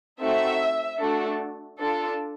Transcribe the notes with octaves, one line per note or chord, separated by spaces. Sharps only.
A3 C4 D#4 F#4 A4 E5
A3 D4 F#4 A4
D4 F4 A4